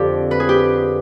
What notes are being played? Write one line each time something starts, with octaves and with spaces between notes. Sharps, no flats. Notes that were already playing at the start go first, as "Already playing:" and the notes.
Already playing: F2 D3 C4 G4 D5
B4
G#4
G4